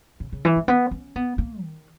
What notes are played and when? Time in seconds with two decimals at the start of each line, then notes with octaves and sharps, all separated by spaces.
0.20 C#3
0.32 C#3
0.45 E3
0.56 G#3
0.68 B3
0.91 C#4
1.16 B3
1.38 A#3
1.62 D#3